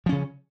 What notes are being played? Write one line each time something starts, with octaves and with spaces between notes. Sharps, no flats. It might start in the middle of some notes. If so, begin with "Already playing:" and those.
C#3 F3 C#4